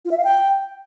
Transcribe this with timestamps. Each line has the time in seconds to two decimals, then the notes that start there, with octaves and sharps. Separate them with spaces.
0.05 F4
0.11 E5
0.18 F5
0.24 G5